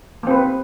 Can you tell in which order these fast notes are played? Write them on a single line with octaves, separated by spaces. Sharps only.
A#3 C4 B4